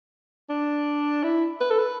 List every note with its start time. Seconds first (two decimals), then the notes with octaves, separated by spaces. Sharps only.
0.50 D4
1.24 E4
1.61 B4
1.71 A4
1.79 B4